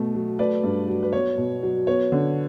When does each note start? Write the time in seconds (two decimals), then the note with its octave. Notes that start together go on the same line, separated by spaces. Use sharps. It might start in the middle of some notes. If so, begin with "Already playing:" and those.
Already playing: B2 A3
0.14 F#3
0.39 A3 B4 D5
0.64 G2
0.88 F#3
1.03 B4
1.13 B3 C#5
1.38 B2
1.63 F#3
1.87 B3 C#5
2.12 D3